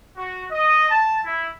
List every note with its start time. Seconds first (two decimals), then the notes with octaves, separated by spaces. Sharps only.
0.17 F#4
0.51 D#5
0.89 A5
1.24 E4